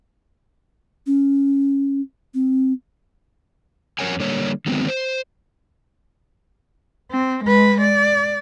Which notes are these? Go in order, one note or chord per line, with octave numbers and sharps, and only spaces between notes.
C#4
C4
F2 A#3 A#4 C#5 F#5 G#5
D3 G3 A#3 C#5
D3 D#3 F#3 G#3 B3 C4
C5
C4
G#3 B4
D5